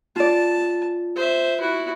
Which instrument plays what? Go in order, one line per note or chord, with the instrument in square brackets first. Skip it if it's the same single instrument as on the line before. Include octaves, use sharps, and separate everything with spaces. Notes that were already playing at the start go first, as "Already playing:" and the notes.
[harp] F4 D5 [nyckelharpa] A5
[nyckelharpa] C5 E5
E4 F#4